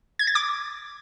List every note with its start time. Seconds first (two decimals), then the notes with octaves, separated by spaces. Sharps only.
0.19 G#6
0.27 A6
0.35 D6